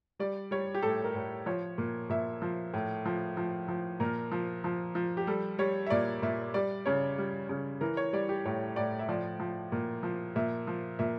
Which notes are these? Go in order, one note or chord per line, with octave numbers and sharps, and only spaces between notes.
G3 D5
G3 C#5
G4
A2 A4
A#4
A2
F3 C#5
A#2
A#2 E5
F3
A2
F3
F3
F3
A#2 A#4
F3
F3
F3
G4
G3 A4
G3 C#5
E5
A#2 D5
A#2 E5
G3 D5
C#3 C#5
G3
C#3
E3 A#4
C#5
G3 D5
G4
A2 C#5
A2 D5
E5
F3 D5
F3
A#2
F3
A#2 E5
F3
A#2 E5